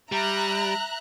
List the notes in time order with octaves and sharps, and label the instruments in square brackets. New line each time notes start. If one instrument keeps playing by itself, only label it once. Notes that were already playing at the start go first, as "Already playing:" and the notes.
[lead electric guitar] G3 [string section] E5 A#5 F#6